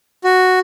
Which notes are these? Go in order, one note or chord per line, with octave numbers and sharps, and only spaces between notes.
F#4